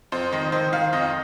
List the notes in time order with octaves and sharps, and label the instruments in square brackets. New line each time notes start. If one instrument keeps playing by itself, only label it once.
[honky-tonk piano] F2 C5
D#3 D#5
D#3 C5
D#3 F5
F2 D#5